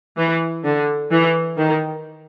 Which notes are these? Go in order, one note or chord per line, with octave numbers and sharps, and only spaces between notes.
E3
D3
E3
D#3